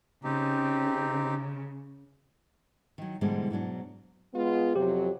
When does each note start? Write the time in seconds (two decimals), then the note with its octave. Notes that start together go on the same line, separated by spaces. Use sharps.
0.24 C#3 C4 D#4 G4
2.98 D#3 F#3
3.21 G#2 B2 D3 E3 G3 G#3
3.50 G#2 B2 F#3 D4
4.34 G#3 B3 F4
4.76 F2 C3 F#3 G4 C5